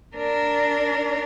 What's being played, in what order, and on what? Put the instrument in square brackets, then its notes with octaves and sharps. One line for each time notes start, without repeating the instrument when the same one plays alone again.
[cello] D4 A#4